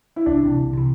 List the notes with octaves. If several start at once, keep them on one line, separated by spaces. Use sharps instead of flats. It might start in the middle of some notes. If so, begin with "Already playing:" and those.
E4
C2 D4
C3 E3
C2
C3 E3